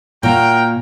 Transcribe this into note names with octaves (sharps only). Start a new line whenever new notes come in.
A#2 F#4 A#4 G5